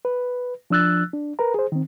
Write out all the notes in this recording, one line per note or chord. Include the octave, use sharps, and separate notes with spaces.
B4
F3 D4 E6 F#6 A6
D4
A#4 B4 A#5
G#4 C5
D#3 C4